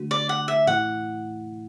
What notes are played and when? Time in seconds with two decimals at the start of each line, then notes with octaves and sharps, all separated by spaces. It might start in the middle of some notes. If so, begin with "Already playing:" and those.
Already playing: D3 A3 D4 F#4
0.11 D5
0.29 F#5
0.48 E5
0.67 A2 E3 A3 E4 F#5